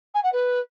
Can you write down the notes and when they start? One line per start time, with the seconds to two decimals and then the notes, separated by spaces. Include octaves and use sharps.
0.14 G#5
0.23 F#5
0.32 B4